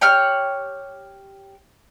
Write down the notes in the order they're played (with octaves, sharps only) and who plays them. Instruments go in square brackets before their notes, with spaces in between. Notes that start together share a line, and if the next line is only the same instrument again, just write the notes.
[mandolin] G4 C#5 F6 F#6